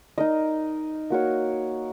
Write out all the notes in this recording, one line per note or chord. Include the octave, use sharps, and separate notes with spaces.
D#4 A#4 D#5
A#3 F#4 A#4 C#5